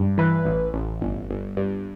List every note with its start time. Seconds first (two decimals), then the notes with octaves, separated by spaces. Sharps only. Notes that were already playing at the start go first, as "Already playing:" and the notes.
Already playing: G2
0.18 E3 B4
0.45 A1
0.74 A1
1.02 G1
1.29 G1
1.57 G2